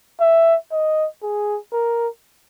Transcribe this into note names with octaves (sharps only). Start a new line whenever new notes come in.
E5
D#5
G#4
A#4